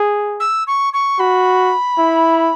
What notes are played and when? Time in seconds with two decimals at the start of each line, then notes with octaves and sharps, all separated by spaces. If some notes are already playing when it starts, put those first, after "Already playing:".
Already playing: G#4
0.40 E6
0.67 C#6
0.93 C#6
1.19 F#4 B5
1.98 E4